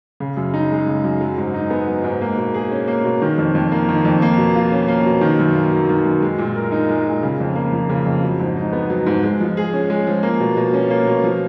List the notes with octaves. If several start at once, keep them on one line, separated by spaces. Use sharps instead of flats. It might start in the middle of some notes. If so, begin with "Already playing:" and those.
C#3
F#2
D#4
G#3
C#3
F#2
F#3
G#2
D#4
B3
F#3
G#2
A#3
B2
G#4
C#4
A#3
B2
D#3
F2
F2
A#3
D#3
F2
A#3
B2
F4
C#4
A#3
B2
D#3
F#2
A#3
F#3
D#3
F#2
G#3
A#2
A#4
D#4
G#3
A#2
C#3
F2
A#3
F3
C#3
F2
F#3
G#2
D#4
B3
F#3
G#2
G#3
F3
G#4
C#4
G#3
F3
A#3
B2
B2
C#4
A#3
B2
F3